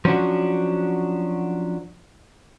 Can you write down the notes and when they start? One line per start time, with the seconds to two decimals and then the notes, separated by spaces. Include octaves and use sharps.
0.05 F3 F#3 C#4 D4 F#4